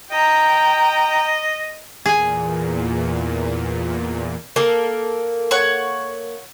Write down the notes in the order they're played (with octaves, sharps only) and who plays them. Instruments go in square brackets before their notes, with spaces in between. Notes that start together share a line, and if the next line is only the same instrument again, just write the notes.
[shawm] D#5 [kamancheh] G5 A#5
[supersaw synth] E2 A#2 [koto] G#4 G#5
[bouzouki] A#3 A4
[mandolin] C#5 F#5 C#6